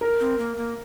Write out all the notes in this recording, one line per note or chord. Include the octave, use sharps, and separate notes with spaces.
A#4
C4
A#3
A#3